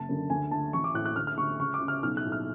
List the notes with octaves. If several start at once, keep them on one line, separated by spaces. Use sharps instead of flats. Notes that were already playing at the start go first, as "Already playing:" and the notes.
Already playing: F#1 A5
F#2 D3
D2 G#5
D3 A5
A1 C#6
D6
A2 F#6
F#6
D2 F6
F6
D3 C#6
C#2 C#6
D6
C#3
F6
B1 F6
F#6
A2
F6